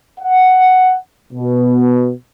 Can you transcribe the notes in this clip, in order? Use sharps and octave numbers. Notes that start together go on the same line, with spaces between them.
F#5
B2